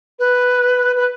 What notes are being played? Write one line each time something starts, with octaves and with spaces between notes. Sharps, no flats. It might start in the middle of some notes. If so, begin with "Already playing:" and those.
B4
B4